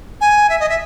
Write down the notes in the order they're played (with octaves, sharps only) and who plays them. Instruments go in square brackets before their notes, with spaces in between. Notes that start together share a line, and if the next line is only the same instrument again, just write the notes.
[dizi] G#5
E5
D#5
E5